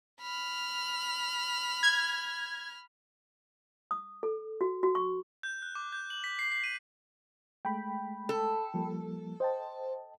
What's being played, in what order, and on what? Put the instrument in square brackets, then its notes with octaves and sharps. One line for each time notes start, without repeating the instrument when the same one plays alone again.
[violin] B5 F6
[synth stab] G#6
[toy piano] D#6
A4
F#4
F#4
C#6
[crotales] G6
F#6
D6
G6
F#7
B6
C7
C7
D#7
[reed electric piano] G#3 A3 [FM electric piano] G5 B5
[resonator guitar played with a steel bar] A4
[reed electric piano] F3 G3 A#3
[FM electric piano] C5 [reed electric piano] D#5 G5 A5